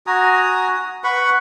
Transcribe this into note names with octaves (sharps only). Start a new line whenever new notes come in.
F#4 G#5 A#5 D#6
B4 F#5 B5 C#6